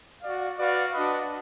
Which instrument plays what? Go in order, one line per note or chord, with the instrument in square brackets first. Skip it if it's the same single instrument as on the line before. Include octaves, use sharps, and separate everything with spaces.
[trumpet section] F#4 D5 F5
F#4 B4 D5 F5
D4 F#4 B4 D#5